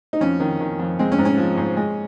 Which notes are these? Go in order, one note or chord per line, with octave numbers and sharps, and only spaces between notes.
D#4
F2 C#4
D#3
D#3
F2
G#3 C4
C#4
G#2
C#4
F3
G#2
G#3